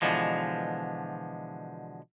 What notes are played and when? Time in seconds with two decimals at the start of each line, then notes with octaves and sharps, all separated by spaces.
0.02 B2 D3 E3 F3 G#3